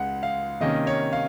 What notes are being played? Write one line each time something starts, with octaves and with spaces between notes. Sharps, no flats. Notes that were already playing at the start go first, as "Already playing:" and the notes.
Already playing: C#2 C#3 G#3 F#5
F5
C3 D#3 A#3 C#4 D#5
C#5
F5